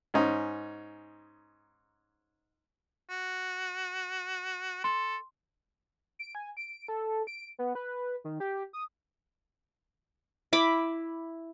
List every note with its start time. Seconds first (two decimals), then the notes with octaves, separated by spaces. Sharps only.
0.14 G#2 C#4 D#4
3.10 F#4
4.84 A4 C6
6.19 D7
6.35 G#5
6.57 D7
6.88 A4
7.27 D7
7.59 B3
7.75 B4
8.24 D#3
8.40 G4
8.73 D#6
10.53 E4 B5 D6